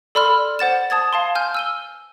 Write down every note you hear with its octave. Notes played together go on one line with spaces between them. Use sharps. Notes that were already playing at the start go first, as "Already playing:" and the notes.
A4 D5 B5 C6 F6
C5 F#5 A6 E7
A5 D#6 G#6 A6
F5 A5 C6
G#5 F6 G6
E6 D#7 G7